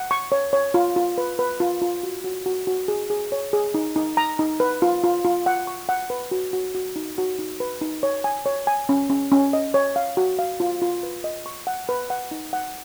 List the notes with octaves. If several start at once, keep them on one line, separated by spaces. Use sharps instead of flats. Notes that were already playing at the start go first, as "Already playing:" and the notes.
Already playing: F#5
C#6
C#5
C#5
F4
F4
B4
B4
F4
F4
F#4
F#4
F#4
F#4
G#4
G#4
C#5
G#4
D#4
D#4
A#5
D#4
B4
F4
F4
F4
F#5
C#6
F#5
B4
F#4
F#4
F#4
D#4
F#4
D#4
B4
D#4
C#5
G#5
C#5
G#5
C#4
C#4
C#4
D#5
C#5
F5
F#4
F5
F4
F4
B4
D#5
C#6
F#5
B4
F#5
D#4
F#5